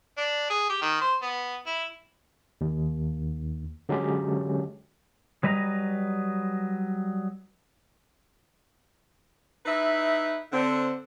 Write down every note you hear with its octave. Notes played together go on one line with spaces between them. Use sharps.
D4
G#4
G4
D#3
C5
B3
E4
D#2
D3 F#3 G#3 C#4 G4
F#3 G3 B4 D#5 F5 A#5
D#4 E4 B4 D#5 E5
D3 C4